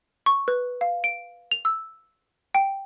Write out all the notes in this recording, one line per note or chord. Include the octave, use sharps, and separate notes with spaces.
C#6
B4
F5
D7
F7
E6
G5